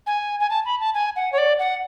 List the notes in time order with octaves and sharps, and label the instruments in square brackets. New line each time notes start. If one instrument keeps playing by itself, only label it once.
[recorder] G#5
G#5
A5
B5
A5
G#5
F#5
C#5
D5
F#5